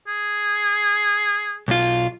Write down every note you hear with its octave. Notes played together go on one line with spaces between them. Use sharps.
G#4
B1 F4